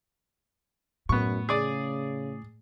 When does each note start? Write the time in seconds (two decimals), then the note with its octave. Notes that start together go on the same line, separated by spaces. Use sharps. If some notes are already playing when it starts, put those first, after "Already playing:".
1.09 F#2 A2 B3 C#6
1.49 C#3 G#4 D5